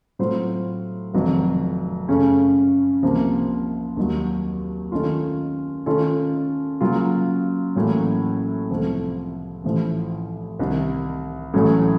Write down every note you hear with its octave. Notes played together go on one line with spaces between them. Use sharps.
A2 F#3 C4 F4 C5
F1 F2 D#3 F#3
F#2 C#3 A3 C#4
C2 C3 F3 A#3
D#2 D#3 F#3
D#3 A3 C#4 F4
D#3 A3 C#4 F4 A4
C#3 F#3 A#3 F4
A1 A2 F#3 A#3 C#4
C2 C3 F3 A3
A1 A2 F3
C2 C3 D#3
A1 A2 F#3 A3 C#4